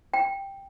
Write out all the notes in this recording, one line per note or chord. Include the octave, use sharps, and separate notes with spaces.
G5